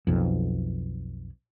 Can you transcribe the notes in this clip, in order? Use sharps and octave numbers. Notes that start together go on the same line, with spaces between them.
B1 F2